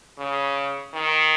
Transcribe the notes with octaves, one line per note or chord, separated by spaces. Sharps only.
C#3
D#3